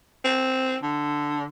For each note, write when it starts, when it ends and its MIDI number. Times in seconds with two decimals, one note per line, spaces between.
0.24 0.77 60
0.83 1.45 50